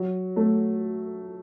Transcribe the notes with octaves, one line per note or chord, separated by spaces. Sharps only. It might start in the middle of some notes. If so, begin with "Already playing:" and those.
Already playing: F#3
A3